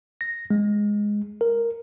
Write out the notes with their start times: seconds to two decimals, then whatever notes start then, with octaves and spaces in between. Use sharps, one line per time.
0.21 A#6
0.50 G#3
1.41 A#4